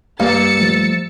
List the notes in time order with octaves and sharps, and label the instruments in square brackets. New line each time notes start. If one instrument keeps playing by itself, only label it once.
[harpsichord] G2 [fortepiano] A#3 [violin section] E6 A6 C#7
[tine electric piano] F3 A3